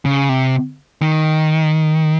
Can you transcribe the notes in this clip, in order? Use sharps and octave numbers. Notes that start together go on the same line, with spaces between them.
C#3
C3
D#3